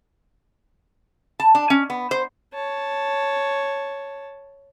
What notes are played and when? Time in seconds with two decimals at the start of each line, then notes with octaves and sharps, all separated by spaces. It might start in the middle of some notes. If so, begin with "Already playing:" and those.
1.40 A5
1.55 D4
1.70 C#4
1.90 B3
2.11 C5
2.54 C#5 A5